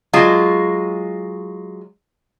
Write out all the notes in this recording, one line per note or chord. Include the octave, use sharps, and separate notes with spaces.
F#3 G#3 F4